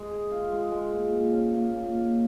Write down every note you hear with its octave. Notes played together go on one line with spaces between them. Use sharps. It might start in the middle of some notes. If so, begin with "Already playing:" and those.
Already playing: G#3
G#4
F4
G#3
G#3
A#2
A#2
C#4
A#3
A#2
A#2